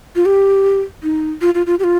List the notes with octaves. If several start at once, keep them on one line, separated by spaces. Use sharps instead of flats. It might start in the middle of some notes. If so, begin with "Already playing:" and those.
F4
G4
D#4
F4
F4
F4
G4
F4